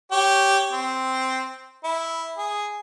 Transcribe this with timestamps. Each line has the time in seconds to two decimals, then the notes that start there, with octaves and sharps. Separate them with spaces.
0.12 G4 C#5
0.73 C4
1.84 E4
2.38 G#4